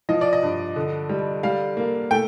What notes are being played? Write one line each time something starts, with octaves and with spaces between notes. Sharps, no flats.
F3 D#5
D5
D#5
G2
D3
G3
G3 F5
A#3
A3 G5